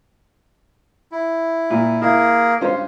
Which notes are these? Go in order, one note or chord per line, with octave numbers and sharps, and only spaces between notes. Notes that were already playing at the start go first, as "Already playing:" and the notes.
E4
A#2
A#3 E4 G#4 A#4
G2 C#4 F4 C5